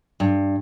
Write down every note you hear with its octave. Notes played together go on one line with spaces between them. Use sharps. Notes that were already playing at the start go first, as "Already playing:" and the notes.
G2